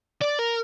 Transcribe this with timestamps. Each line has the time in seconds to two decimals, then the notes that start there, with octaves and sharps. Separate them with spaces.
0.21 D5
0.39 A#4